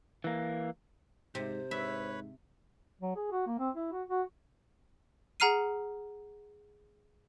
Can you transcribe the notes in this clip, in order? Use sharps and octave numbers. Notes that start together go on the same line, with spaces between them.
E3 A#3
G#2 C3 C5
G#2 B4 C#5 E5 B5
F#3
G#4
F#4
A#3
C4
E4
F#4
F#4
G#4 F#5 A#5 F6 C7 D#7